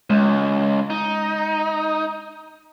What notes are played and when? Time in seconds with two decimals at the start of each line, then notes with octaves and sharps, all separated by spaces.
0.10 C#2 G#3
0.90 D#4